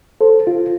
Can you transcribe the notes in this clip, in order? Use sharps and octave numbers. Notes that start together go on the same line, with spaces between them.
A4 C5
F4